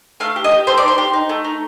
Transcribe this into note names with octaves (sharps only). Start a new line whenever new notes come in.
A3 F5
G4
D#5
G4
A3 C5
D5
D#4
C5
G4
D#4
A3
D#4